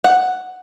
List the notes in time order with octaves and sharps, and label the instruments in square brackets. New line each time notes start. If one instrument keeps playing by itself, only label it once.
[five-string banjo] F#5